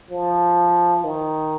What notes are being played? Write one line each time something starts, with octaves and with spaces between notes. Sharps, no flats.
F3
D#3